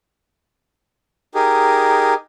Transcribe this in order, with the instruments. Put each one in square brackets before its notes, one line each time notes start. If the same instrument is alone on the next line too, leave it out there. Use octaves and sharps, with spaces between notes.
[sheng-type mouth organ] D#4 G4 G#4 A#4